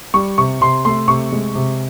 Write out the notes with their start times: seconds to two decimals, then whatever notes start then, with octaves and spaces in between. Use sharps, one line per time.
0.14 G3 C#6
0.38 C3 C#6
0.61 C3 C6
0.85 A3 C6
1.08 C3 C#6
1.32 G#3
1.55 C3